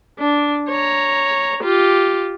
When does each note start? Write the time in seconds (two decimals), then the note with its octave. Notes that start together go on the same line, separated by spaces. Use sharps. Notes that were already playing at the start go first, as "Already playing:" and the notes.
0.19 D4
0.69 C#5 A#5
1.63 F4 G4